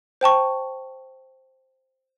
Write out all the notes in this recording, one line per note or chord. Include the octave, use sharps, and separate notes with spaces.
C5 G5 A5 C#6